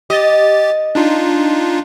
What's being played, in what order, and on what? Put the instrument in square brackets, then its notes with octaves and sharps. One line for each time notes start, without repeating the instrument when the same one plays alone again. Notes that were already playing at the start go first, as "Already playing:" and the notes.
[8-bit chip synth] G4 A6 [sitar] D#5
[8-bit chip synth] D4 D#4 F4